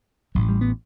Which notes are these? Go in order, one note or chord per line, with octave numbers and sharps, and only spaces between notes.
A1 A2 F#3
G3
B3